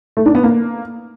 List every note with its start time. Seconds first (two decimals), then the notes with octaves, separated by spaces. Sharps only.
0.17 A3
0.26 D4
0.35 B3
0.44 A#3